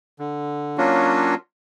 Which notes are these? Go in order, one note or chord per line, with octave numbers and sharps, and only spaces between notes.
D3
F#3 A#3 C#4 D4 F4 F#4